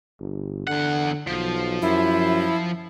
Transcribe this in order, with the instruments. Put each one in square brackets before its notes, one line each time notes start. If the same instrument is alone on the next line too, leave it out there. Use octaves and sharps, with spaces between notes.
[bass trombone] G1
[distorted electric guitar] E2 F#5 [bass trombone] D3
[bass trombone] B1 [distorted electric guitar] F3
[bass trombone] F#2 [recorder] E4